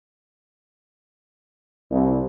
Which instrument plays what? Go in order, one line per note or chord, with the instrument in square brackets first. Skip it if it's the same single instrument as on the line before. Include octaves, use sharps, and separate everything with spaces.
[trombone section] C2